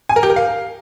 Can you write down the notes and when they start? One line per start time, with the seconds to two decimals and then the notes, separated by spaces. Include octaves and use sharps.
0.09 G#5
0.16 A#4
0.23 G4
0.30 A#4
0.36 F5